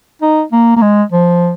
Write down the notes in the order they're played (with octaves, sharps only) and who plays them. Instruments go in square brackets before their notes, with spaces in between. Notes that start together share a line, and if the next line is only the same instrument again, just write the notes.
[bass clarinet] D#4
A#3
A#3
G#3
F3